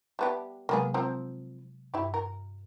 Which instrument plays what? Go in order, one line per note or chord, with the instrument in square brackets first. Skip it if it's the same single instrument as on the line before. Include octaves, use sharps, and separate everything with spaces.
[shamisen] G3 B3 G4 [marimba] E5 A5 F#6
[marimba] C3 F#3 G#3 [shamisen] A#3 B3 G#4
[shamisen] F3 C4 A#4
[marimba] G2 [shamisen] E4 G4
[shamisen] A#4